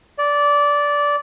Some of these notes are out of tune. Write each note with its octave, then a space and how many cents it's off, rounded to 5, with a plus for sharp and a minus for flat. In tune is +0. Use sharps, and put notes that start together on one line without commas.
D5 -15